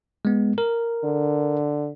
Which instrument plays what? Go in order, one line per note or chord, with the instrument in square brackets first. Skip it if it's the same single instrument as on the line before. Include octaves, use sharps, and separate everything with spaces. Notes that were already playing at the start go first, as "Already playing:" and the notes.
[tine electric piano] G#3 B3
A#4
[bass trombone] D3